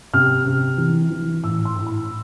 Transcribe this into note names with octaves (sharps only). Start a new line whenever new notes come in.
C3 F6
C3
E3
E3
A2 E6
C6
A2
B5